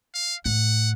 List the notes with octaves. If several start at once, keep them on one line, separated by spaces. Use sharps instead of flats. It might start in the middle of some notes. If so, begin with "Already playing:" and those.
F5
A2 F#5